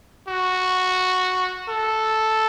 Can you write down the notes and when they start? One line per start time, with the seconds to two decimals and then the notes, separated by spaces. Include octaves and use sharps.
0.28 F#4
1.69 A4